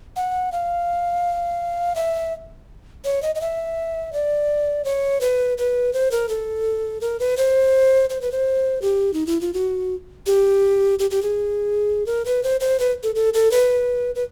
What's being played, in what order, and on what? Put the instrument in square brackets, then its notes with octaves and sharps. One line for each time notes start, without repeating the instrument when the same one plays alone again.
[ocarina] F#5
F5
E5
C#5
D#5
D#5
E5
D5
C#5
B4
B4
C5
A#4
A4
A#4
B4
C5
C5
B4
C5
G4
D#4
E4
F4
F#4
G4
G4
G4
G#4
A#4
B4
C5
C5
B4
A4
A4
A4
B4
B4